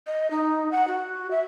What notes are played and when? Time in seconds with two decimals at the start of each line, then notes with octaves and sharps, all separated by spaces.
0.07 D#5
0.31 D#4
0.72 F#5
0.88 F#4
1.31 E5